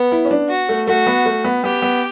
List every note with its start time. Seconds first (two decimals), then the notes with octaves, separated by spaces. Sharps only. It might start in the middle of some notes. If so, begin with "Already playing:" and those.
Already playing: B3
0.12 E4
0.25 C#4
0.31 D4
0.49 F#4
0.69 A3
0.88 A3 F#4
1.07 B3
1.26 A3
1.44 B3
1.64 B3 G4
1.82 B3